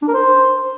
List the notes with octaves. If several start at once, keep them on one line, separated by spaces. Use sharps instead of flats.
D4
A#4
C5